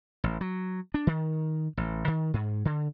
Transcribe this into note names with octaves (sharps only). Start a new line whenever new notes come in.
A1
F#3
D4
D#3
A1
D#3
G#2
D3